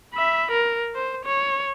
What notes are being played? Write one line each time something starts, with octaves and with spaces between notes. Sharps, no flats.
E5 B5
A#4
C5
C#5